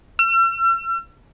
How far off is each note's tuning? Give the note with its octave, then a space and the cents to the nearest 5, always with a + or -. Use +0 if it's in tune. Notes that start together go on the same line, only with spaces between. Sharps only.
E6 +45